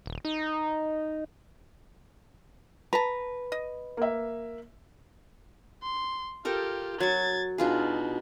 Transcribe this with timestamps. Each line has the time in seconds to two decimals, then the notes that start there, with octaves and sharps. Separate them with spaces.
0.06 D#1
0.25 D#4
2.93 B4 A5 A#5
3.52 D#5
3.97 A#3 E5
5.83 C6
6.45 F4 G4 A4 A#4 G5
7.00 F#3 C#6 G#6 A6
7.58 B2 D4 D#4 F4 G#4